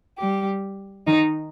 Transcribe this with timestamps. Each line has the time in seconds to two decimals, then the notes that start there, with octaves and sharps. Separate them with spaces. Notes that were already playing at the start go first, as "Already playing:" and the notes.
0.19 G3 G4
1.07 D#3 D#4